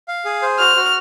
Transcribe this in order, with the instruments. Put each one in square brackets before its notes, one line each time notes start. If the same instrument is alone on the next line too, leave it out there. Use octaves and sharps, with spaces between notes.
[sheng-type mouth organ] F5
G#4
C5
[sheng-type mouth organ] F#4 [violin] F6
[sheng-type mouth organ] F#4